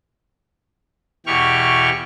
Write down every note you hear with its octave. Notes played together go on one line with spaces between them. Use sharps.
E2 B2 E3 G4 C#6 F6